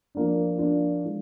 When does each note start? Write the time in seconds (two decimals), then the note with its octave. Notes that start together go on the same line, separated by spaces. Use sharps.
0.15 F3 A#3 D4
0.58 F3 A#3 D4 F4
1.04 E3 G#3